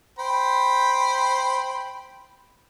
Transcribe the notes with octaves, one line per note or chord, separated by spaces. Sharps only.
C5 G5 B5